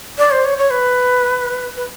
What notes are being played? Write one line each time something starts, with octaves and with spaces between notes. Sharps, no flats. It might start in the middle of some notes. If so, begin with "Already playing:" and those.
D5
C5
C#5
C#5
B4
B4